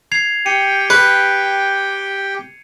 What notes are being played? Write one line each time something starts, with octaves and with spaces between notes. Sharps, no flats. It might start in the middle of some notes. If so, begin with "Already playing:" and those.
G#6 C7 F7
G4 G5 C#7 D#7
B4